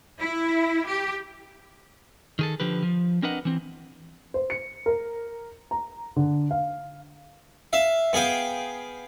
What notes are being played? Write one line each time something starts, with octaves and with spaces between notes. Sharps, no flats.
E4
G4
D#3 G#4 A4
D3 F3 G4 B4
F3
C4 D4 A#4 B4 D#5 F#5
E3 C4
C5
C#7
A#4
A#5
D3
F5
E5 F5
B3 G#4 F5 G5